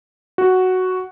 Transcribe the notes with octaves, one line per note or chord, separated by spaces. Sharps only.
F#4